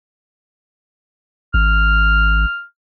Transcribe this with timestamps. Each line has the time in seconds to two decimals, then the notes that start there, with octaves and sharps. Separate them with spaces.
1.54 G#1 F6